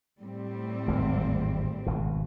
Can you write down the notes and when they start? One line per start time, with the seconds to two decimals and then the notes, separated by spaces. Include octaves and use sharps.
0.23 A2 G3 C4
0.87 G#1 E2
1.86 G#1 B2